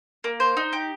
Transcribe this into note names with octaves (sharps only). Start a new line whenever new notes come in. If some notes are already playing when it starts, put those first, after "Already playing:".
A#3
C5
D#4
G4